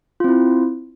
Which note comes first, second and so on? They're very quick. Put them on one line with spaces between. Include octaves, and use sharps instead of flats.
F4 C4 E4